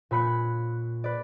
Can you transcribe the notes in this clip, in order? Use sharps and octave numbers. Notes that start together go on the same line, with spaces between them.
A#2 C#5 B5 F#6 C#7
B4 D5